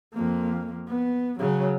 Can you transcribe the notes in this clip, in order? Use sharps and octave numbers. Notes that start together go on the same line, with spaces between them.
F2 A#3
B3
C#3 F#3